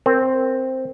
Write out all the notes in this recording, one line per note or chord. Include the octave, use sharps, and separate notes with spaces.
C4 A#4